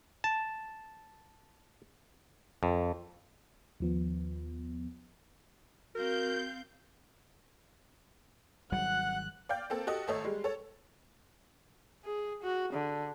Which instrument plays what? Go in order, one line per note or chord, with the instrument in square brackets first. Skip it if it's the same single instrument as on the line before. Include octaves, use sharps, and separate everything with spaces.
[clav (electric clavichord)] A5
F2
[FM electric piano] D#2 F3 B3
[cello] C4 F5 [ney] F#4 [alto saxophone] A#4 [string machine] G6
[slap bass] G#1 F#3 G3 [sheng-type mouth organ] F#5 [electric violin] F#6
[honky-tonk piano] D5 F5 G5 G6
A#3 C4 A4
F#4 G4 A4 D#5
G#1 A3 A4 C#5 D#5
G3 G#3
A4 C#5
[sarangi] G#4
F#4
D3